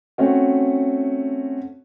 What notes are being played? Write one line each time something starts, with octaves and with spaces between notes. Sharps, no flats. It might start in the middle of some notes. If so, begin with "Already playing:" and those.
A3 C4 C#4 F#4